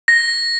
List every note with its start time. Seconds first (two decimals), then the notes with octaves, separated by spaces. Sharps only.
0.08 A#6